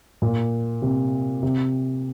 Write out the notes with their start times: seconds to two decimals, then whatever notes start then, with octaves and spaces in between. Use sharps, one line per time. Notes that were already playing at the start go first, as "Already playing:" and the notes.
0.22 A#2
0.82 C3
1.43 C3